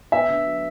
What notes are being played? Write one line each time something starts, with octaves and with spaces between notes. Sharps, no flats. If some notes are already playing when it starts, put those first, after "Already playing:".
B3 E5
D3
F#3